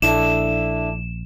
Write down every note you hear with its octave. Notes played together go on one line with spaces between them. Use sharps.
A#1 D4 E4 A4 E7